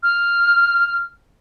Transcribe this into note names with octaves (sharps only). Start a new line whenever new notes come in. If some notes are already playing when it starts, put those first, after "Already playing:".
F6